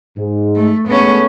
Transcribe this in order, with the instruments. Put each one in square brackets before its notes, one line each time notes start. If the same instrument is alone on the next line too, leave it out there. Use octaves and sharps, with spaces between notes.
[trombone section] G#2
[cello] A3
[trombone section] G#3 A3 [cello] B3 C#4